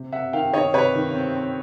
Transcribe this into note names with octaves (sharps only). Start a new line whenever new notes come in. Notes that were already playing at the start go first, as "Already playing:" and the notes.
Already playing: C3
C3 E5 F#5
D#3 F5 G5
D#3 C#5 D#5
C3 B4 C#5
D#3
C4
C4